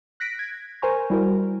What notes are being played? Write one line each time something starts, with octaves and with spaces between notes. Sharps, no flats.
F#6 A#6 B6 D7
G#6
A#4 C5 G#5 A#5 C#6
G3 E4 F#4 A#4